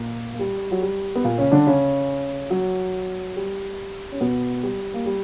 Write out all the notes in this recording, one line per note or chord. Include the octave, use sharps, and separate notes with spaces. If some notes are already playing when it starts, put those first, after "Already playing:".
Already playing: A#2 A#3
A#3
G3
F#3
G3
B3
A#2 A#3
C#3 C#4
D3 D4
C#3 C#4
F#3
G3
C#4
B2 B3
G3
A#3
G3